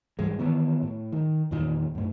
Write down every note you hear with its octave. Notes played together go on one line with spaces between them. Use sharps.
G#2 E3 G3 G#3
D#3 E3 B3
A2
D#3
E2 A#2 D#3
F#2 A2